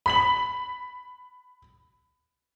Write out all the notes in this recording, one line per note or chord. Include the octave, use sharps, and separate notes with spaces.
B5 B6 F#7